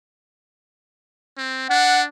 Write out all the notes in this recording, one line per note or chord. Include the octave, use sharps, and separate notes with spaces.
C4
D4 F#5